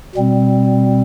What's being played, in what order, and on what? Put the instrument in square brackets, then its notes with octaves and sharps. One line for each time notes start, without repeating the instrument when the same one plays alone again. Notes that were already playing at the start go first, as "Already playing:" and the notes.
[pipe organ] B2 G3 C4